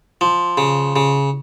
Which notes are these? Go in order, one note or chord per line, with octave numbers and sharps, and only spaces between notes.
F3
C#3
C#3